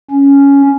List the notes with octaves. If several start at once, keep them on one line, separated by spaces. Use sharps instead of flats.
C#4